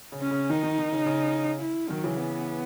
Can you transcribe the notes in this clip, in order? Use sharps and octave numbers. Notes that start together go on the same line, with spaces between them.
C#3
C#4
C#3
D#3 D#4
D#3
D#3
C#3
C#3
E4
D#3 F#3
C#3 E3
B3